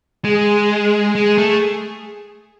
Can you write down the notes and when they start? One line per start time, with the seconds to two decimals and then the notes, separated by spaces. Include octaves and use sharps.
0.24 G#3 G#4
1.15 G#3 G#4
1.38 A3